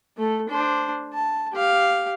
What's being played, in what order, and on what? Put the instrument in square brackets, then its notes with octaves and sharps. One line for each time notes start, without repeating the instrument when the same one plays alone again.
[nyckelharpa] A3 A4
D4 C5
A5
G4 F5